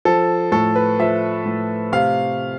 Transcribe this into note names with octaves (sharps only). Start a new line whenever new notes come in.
F3 A4
A2 A4
B4
F3 E5
A2
C3 F5